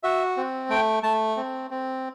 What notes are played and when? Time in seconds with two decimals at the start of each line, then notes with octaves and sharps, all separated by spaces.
0.03 F#4 E5
0.37 C4
0.69 A3 G5
1.03 A3 A5
1.37 C4
1.71 C4